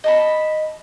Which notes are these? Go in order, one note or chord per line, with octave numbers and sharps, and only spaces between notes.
D#5 A5 B5